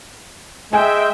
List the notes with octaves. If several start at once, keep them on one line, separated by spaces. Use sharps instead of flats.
G#3 E5 G5 G#5